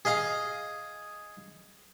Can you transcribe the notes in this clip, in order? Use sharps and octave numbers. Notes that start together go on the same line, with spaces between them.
G#4 D#5 F5 A#5